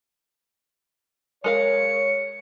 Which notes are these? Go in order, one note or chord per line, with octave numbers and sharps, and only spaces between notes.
G#3 A#4 C#5 F5 C#7